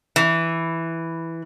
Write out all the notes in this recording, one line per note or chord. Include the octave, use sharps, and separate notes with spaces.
E3